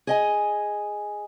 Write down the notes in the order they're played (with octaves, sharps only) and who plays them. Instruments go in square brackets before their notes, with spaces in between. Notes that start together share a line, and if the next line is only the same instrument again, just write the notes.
[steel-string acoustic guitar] G#4 D#5 G#5